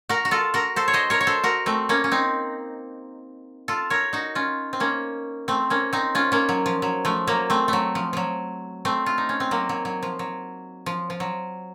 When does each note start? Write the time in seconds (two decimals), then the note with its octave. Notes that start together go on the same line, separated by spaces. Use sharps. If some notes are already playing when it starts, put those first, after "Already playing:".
0.09 F#4 A#4
0.25 F#4
0.31 F4 A4
0.54 F#4 A#4
0.76 A4 C5
0.88 C#5
0.94 C5 D#5
1.10 A#4 C#5
1.21 C#5
1.27 A4 C5
1.44 F#4 A#4
1.66 A3 C4
1.89 A#3 C#4
2.04 C#4
2.12 C4 D#4
3.68 F4 A4
3.90 A#4 C#5
4.13 D#4 F#4
4.35 C#4 F4
4.73 C4
4.80 A#3 C#4
5.48 A3 C4
5.70 A#3 C#4
5.93 C4 D#4
6.15 C#4 F4
6.32 A#3 C#4
6.49 F#3
6.66 F3
6.82 F#3
7.05 F3 A3
7.27 F#3 A#3
7.50 A3 C4
7.68 F#3 A3
7.95 F3
8.13 F3 F#3
8.85 A3 C4
9.06 F4
9.18 D#4
9.29 C#4
9.40 C4
9.51 F#3 A#3
9.69 F#3
9.85 F#3
10.03 F3
10.19 F#3
10.86 F3
11.10 F3
11.20 F#3